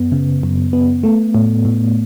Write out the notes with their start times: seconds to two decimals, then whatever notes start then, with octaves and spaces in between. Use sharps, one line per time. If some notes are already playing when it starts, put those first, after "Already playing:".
Already playing: F#2 B3
0.12 C#3
0.43 F#2
0.73 B3
1.03 A3
1.35 A2
1.65 A2